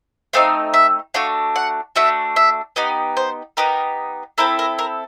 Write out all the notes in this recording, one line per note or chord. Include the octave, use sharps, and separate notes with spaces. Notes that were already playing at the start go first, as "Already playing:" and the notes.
A3 C4 D#4 F5
E5
A3 D4 F#4 F5
F#5
A3 D4 F#4 E5
E5
B3 D#4 G4 D#5
C5
B3 D#4 G4 A#4
C4 E4 A4 A#4
A#4
A#4